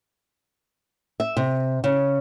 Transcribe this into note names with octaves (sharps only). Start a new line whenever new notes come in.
E5
C3
C#3